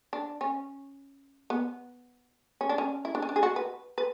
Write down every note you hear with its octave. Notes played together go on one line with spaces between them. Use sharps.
D4
C#4
B3
C#4
D4
C#4
E4
D4
C#4
D4
G#4
F#4
B4
B4